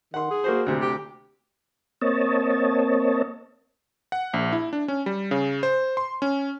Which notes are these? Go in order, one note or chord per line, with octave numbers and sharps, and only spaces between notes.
D#3 F#5 C6
G#4
A#3 F#4 C5
D2 C3
G4
A#3 C4 C#5 D#5 A5
F#5
A#1
E4
D4
C#4
G3
C#3
C5
C6
C#4